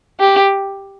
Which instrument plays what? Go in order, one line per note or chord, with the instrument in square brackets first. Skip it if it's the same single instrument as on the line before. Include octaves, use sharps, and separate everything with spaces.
[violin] G4